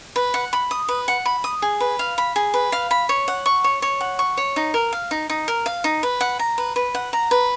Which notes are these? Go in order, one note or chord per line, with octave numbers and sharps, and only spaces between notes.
B4
F#5
B5
D#6
B4
F#5
B5
D#6
G#4
B4
F5
B5
G#4
B4
F5
B5
C#5
F#5
C#6
C#5
C#5
F#5
C#6
C#5
D#4
A#4
F5
D#4
D#4
A#4
F5
D#4
B4
F#5
A#5
B4
B4
F#5
A#5
B4